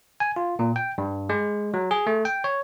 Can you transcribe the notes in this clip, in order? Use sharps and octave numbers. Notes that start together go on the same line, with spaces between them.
G#5
F4
A#2
G5
G2
G#3
F#3
G#4
A3
G5
C#5